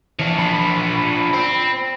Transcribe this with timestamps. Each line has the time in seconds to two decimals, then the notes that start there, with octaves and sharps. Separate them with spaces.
0.19 E3 F3 D4
0.39 B5
1.33 C4